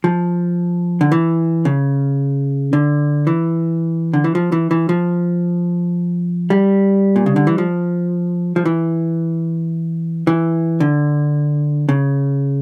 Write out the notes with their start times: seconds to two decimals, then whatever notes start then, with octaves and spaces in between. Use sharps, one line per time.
0.04 F3
1.01 D3
1.12 E3
1.65 C#3
2.73 D3
3.27 E3
4.13 D3
4.24 E3
4.35 F3
4.52 E3
4.71 E3
4.89 F3
6.50 G3
7.16 A#2
7.26 C#3
7.36 D3
7.47 E3
7.58 F3
8.56 F3
8.66 E3
10.27 E3
10.80 D3
11.89 C#3